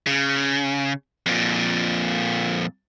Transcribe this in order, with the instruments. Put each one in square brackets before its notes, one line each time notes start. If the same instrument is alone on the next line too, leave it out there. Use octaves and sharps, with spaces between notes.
[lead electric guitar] C#3
F2 A#2